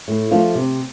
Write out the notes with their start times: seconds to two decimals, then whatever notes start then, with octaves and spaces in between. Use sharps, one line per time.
0.08 A2
0.31 F3 A3 D4 F4
0.55 C3